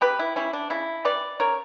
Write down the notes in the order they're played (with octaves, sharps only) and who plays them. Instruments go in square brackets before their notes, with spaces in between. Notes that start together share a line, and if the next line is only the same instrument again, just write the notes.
[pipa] C#3 G4 B4
E4
G3 C#4 E4
D4
C#3 E4
G3 C#4 B4 D5
C#3 A#4 C#5